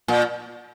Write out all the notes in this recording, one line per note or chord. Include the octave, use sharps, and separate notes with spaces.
A#2